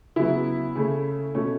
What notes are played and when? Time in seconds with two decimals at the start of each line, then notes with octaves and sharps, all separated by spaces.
0.16 C#3 F#3 B3 E4
0.75 C#3 A3 C#4
1.35 B2 A3 C#4